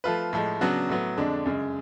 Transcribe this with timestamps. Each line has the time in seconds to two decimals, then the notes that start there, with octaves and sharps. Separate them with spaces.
0.04 F3 A3 F4 B4
0.33 A2 F3 G#3
0.61 C#3 F#3 B3 D4 F#4
0.89 A2 F#3 B3
1.17 F2 D3 G#3 D4
1.46 F#2 C#3 G#3